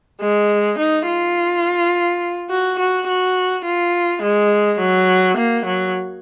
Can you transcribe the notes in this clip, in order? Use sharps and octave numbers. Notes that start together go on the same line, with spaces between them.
G#3
D#4
F4
F#4
F#4
F#4
F4
G#3
F#3
A#3
F#3